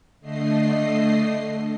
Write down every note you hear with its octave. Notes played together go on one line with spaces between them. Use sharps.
D3 A3 D#5 C7